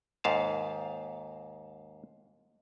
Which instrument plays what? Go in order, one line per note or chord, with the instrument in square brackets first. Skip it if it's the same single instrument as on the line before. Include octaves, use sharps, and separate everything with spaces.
[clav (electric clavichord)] D#2 G#2 F5 A5